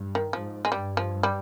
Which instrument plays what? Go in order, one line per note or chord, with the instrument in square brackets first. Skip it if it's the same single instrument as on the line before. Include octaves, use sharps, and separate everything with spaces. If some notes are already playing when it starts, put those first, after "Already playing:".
Already playing: [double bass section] G2
[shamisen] D#3
[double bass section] G#2 [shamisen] F3
[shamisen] G#3
[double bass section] G2 [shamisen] G3
[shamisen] F3
G3